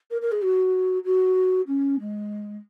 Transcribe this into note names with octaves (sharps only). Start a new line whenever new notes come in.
A#4
A#4
G#4
F#4
F#4
C#4
G#3